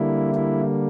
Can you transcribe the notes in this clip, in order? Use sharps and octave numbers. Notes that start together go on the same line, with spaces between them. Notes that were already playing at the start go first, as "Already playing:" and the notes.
Already playing: D3 G3 A#3 E4
E4